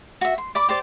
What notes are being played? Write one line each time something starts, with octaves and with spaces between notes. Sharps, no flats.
F#4 E5
C6
D5 B5 D6
G4 C5 D5